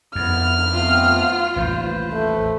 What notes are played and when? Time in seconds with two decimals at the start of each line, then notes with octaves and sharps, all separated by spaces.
0.15 F2 B3 E4 F6
0.74 A3 B3 C4 F4
1.56 A1 D#2 B4 C5
2.13 A3